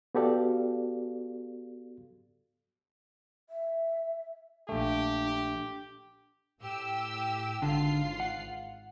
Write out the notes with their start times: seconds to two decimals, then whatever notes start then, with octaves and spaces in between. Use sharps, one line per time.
0.15 B3 F#4 G4 A4 D5 F5
3.50 E5
4.69 A#1 A3 D4 G4
6.60 A2 G4 E6
7.62 G#1 D3 F4 C7
8.20 F#5